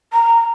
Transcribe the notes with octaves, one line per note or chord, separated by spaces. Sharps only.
A#5